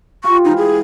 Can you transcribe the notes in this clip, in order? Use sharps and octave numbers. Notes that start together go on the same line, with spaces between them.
F4 G4 C#6
E3 G#3 D#4
G#4